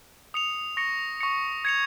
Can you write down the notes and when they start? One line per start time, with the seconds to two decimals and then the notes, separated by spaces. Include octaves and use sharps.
0.34 D#6 C#7 F7
0.77 C#6 A#6 C#7
1.21 C#6 A#6 C#7
1.65 G#6 C#7 F7